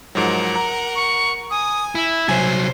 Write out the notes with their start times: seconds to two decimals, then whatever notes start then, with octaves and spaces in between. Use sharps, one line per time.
0.15 G#2 F3 F#3 A#4 F#5
0.56 A#5
0.95 C#6
1.50 G#5 D#6
1.95 E4 E5
2.28 C2 F#3 C5 G#5 G#6